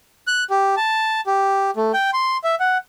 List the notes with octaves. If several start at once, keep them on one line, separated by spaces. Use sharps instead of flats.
F#6
G4
A5
G4
A3
G5
C6
E5
F#5